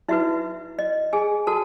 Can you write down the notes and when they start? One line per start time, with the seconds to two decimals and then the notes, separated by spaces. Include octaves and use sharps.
0.08 D#4 E4 F#4 B4 E5
0.79 D#5
1.13 G#4 G#5
1.47 F#4 A4 A5